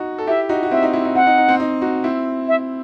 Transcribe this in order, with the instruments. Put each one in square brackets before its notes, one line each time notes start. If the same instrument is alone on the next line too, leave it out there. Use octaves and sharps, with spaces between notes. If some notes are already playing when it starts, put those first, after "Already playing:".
Already playing: [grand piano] D#4 F#4
A4
[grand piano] E4 G4 [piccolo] E5
[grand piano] D#4 F#4
F#4
[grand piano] C4 E4 [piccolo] E5
[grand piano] D#4
C4 E4
D#4
[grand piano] C4 [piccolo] F#5
[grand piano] D#4
D#4
C4
D#4
D#4 F#4
C4 E4
[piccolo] E5